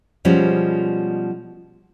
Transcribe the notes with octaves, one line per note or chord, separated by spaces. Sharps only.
B2 F3 G3 G#3 C#4